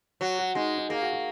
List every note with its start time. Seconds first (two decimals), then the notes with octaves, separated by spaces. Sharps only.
0.21 F#3 F#4
0.39 F#4
0.55 G#3 D#4
0.78 D#4
0.89 A#3 G#4
1.02 F#4
1.13 F#4